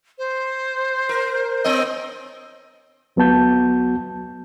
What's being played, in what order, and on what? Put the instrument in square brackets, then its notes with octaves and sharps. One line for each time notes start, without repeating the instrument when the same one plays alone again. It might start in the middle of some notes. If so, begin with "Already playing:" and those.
[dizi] C5
[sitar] A#4
B3 D#5
[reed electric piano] D2 F#3 B3 F#4 A5 G6